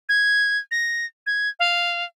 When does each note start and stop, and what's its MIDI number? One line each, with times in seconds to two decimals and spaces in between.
0.09 0.58 92
0.71 1.06 94
1.26 1.49 92
1.59 2.04 77